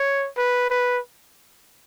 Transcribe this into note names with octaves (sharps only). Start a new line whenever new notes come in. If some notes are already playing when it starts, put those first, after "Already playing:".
Already playing: C#5
B4
B4